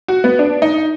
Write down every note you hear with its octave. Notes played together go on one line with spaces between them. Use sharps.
F#4
B3
D4
D#4